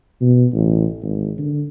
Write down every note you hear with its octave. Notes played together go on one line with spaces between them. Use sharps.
B2
A1
G#1
D3